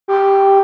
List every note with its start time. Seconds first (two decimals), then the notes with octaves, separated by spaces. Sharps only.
0.08 G4